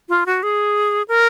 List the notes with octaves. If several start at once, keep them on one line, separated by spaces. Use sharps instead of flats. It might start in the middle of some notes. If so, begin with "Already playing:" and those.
F4
F#4
G#4
A#4